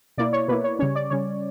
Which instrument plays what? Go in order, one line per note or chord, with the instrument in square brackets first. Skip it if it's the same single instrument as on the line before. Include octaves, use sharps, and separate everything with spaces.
[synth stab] B2 A#3 E4 D5
C#5
B2 A#3 E4 B4
C#5
C#3 G3 C#4 C#5
D5
C#3 G3 C#4 C#5